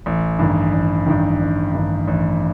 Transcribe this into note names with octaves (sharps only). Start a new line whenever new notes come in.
A1
G2 D#3
A1
G2 D#3
A1
G2 D#3
A1